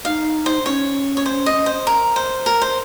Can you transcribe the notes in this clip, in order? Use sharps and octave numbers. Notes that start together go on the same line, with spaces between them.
D#4 F5
C5
C#4 C#5
C#5
C5
D#5
C5
A#4
C5
A#4
C5